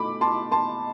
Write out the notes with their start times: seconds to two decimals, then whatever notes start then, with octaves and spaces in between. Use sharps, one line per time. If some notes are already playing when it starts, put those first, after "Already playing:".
Already playing: B2 A3 B5 D6
0.21 A5 C6
0.52 A5 C6